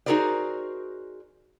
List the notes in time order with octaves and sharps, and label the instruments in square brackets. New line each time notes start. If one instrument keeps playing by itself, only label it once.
[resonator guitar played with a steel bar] D#4 F#4 G#4 A#4 C5 D5